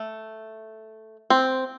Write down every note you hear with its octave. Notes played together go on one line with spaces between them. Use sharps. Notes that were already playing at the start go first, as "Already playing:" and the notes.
Already playing: A3
C4